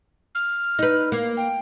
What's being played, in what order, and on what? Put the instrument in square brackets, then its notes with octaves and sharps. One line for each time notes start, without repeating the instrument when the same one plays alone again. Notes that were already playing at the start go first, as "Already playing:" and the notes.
[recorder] F6
[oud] D#4 B4
A#3
[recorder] G5